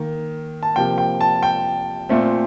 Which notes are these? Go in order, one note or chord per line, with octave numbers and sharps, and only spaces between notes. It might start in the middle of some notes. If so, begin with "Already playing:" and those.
Already playing: D#3 A#3
A5
C3 F3 A#3 G5
G5
A5
G5
A#2 A3 C4